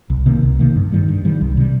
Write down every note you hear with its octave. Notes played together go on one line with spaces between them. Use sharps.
C2
C3 D#3 A#3
C2
C3 D#3 A#3
G2
D#3 G3
G2
D#3 G3
C2
C3 G3